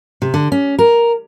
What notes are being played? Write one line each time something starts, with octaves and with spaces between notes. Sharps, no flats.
C3
D3
C#4
A#4